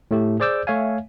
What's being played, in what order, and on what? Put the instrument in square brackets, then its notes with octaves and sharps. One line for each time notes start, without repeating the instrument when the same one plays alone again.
[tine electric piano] A2 A3 G4
G#4 C5 D5 D6 E6 G6
A3 C#5 E5 F5 G#5